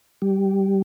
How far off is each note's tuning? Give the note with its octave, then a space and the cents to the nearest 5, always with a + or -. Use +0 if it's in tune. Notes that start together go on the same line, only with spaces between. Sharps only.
G3 -10